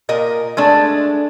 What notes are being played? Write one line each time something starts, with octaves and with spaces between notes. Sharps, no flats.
A#2 A#4 D#5
G#3 A3 D4